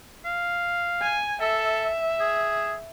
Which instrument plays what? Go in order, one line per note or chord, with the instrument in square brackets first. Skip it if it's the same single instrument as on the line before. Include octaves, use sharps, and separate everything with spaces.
[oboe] F5
[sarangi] G#5
[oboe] A4 [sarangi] E5
[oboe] G#4